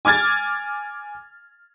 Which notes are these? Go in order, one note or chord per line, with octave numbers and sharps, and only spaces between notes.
G#5 D6 F6 G#6 A6